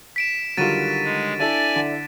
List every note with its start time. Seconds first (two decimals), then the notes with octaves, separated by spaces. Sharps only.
0.16 B6 D7 E7
0.57 D3 D#3 F#3 G3 F4 A6 D#7 E7
1.04 G#3
1.39 D4 E4 A4 D5 G#5
1.76 D3